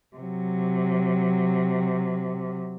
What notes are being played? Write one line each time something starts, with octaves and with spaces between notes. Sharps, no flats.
C3 F#3